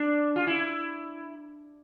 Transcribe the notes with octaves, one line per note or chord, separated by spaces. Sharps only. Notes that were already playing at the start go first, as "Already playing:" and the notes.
Already playing: D4
F4
E4